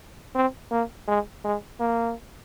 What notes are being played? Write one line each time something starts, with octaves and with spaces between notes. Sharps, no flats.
C4
A#3
G#3
G#3
A#3